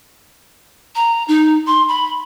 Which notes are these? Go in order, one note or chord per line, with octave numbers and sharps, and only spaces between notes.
A#5
D#4
C6
B5